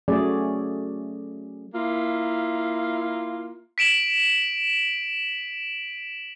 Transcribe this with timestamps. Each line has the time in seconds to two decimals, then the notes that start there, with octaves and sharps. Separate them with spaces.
0.08 F#3 A3 C#4 G#4 D5
1.75 A#3 E4 F4
3.78 B6 D7 E7 F#7